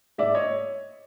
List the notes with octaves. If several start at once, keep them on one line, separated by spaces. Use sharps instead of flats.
G#2 D5 E5
C#5 D#5